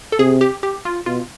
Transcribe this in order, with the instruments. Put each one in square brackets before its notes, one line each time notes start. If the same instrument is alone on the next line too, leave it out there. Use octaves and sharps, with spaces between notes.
[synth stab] A4
[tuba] C3 [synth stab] G#4
[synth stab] G4
G4
F4
[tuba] B2 [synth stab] F4